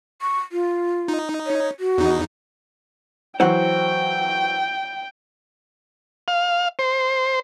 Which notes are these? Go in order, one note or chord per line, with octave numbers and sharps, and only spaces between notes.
C#6
F4
D#4
C#5
F#4
E2 D#4
E3 F#3 F#4 C5 F#5 G5
F5
C5